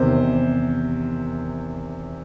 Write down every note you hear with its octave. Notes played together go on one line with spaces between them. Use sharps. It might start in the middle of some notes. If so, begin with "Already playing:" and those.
Already playing: E2 C3 D#3 C5